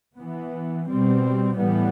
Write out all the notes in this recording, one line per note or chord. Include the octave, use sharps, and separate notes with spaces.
E3 B3
B2 G3 C4
A2 E3 G3 B3